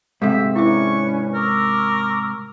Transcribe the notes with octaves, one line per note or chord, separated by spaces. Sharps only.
G#2 C3 G4 A4 E5 F5
C#4 D4 E4 G#4 B4 E5 C#6
A#4 C#6 D6 E6